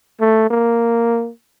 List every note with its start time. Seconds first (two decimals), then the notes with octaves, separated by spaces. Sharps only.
0.21 A3
0.51 A#3